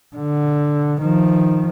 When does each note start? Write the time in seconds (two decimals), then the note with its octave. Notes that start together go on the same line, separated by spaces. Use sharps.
0.16 D3
1.01 D#3 F3